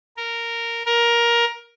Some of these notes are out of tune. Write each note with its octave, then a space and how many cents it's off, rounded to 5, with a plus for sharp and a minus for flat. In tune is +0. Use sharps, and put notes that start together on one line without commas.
A#4 -5
A#4 +15